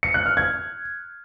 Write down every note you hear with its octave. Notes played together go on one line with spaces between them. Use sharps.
C#7
F#6
F6
G#6